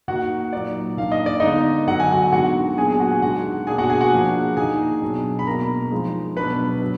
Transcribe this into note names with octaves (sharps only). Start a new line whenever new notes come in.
D#3 A#3 D#4 F#4 F#5
A#2 F#3 A#3 D#4 D5
D#3 A#3 D4 F5
D#5
D5
D3 G#3 B3 D#4 D#5
D3 F#3 D4 F#5
G#5
F#4 F#5
D#3 G#3 B3 D4 F#4 F#5
A#2 F#3 B3 D4 G#4 G#5
G#4 G#5
F#4 F#5
G#4 G#5
D#3 G#3 D4 F#4 F#5
B2 A#3 D4 G#4 G#5
F#4 F#5
G#4 G#5
F#4 F#5
F3 A#3 D4
D#3 A#3 D#4 G#4 G#5
B2 F#3 D4
B5
B2 A#3 D4 A#4 A#5
F3 G#3 D#4
B2 F#3 D4 B4 B5
F#3